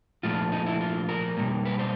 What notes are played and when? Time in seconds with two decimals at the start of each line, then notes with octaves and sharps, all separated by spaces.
0.23 A#2 F3 A3 F4
0.52 D#4
0.66 E4
0.81 F4
1.09 A#4
1.37 B2 G3 A#3
1.65 B4
1.79 C5